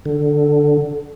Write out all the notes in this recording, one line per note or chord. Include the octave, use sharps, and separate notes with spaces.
D3